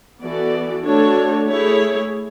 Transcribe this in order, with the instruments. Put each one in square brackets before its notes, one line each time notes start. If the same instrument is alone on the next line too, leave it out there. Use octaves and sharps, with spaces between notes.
[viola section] E3 B3 F#4 A4 D5
A3 D4 F#4 A4 C#5
A3 E4 G#4 C#5